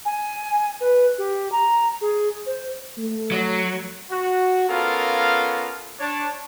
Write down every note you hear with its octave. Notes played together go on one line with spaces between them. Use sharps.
G#5
B4
G4
A#5
G#4
C5
A3
F#3
F#4
B3 C#4 F4 A4 A#4 F5
D4 C#5 A5